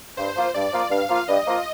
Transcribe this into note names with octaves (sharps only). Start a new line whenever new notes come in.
G2 C5
F3 A#3 F4
G2 D5
F3 A#3 F4
G2 F5
F3 A#3 F4
G2 D#5
F3 A#3 F4